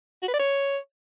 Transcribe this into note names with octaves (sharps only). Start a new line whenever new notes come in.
F#4
B4
D5
C#5